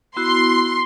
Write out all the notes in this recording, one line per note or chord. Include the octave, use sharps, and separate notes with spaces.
B3 E4 F#4 C6